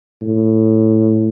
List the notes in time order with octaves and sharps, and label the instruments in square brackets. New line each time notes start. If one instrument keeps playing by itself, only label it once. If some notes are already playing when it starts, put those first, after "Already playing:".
[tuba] A2